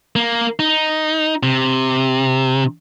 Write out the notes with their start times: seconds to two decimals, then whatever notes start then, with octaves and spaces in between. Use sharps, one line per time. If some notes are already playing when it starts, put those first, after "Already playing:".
0.16 A#3
0.59 D#4
1.43 C3